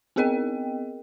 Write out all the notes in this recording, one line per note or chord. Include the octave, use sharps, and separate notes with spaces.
B3 C4 G#4 A#4 D#5 G5